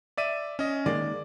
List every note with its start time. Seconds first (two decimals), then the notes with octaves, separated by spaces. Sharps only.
0.17 D5 E5 D#7
0.59 C#4 D#5
0.86 D#3 G#3 A#3 D5